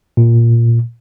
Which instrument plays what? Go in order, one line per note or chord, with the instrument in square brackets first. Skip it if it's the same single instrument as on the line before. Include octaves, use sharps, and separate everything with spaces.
[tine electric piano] A#2